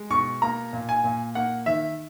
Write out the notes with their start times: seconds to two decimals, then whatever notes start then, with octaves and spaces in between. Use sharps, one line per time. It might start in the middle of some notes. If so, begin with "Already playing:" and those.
Already playing: G#3
0.10 B2 C#6
0.42 A#3 A#5
0.73 A#2
0.89 G#5
1.04 A#2
1.35 A#3 F#5
1.66 D#3 E5